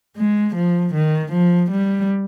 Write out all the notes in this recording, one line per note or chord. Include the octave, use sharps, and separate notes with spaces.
G#3
F3
D#3
F3
G3